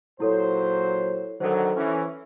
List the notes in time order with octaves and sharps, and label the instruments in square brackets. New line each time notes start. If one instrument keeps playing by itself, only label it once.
[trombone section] A#2 F#3 C5 [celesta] E4 A4 C#5
[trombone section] D3 D#3 F#3 [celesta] A4 C5
[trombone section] E3 C#4